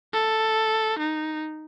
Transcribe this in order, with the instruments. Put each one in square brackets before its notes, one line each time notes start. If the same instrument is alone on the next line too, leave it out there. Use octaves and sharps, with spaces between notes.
[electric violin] A4
D#4